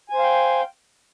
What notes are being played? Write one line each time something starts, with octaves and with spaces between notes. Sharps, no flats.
C5 F5 G5 G#5